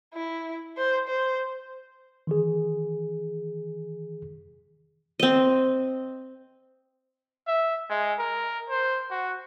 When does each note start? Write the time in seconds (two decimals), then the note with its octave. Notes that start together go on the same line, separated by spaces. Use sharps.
0.14 E4
0.77 C5
1.08 C5
2.27 D#3 E3 G#4
5.20 C4 D#5
7.47 E5
7.90 G#3
8.19 A#4
8.70 C5
9.11 F#4